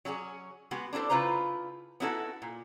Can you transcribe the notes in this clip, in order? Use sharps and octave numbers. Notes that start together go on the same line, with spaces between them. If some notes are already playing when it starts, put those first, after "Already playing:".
F#3 C#4 F#4 G#4
G#3 B3 F#4 G4
D4 E4 F4 A4 C5
C#3 E4 F4 B4 C5 A#5
B3 C#4 D#4 E4 F#4 A4
A#2